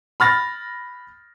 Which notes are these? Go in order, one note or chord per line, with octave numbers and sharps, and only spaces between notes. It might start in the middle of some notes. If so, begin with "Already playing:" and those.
B5 F6 A6 A#6